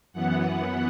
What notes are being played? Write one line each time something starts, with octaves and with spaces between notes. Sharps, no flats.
F#2 E3 B3 F#5